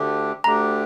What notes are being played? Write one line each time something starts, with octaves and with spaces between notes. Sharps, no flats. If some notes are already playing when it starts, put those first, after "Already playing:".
Already playing: D2 D3 A3 D4 G4
D2 D3 A3 D4 G4 A#5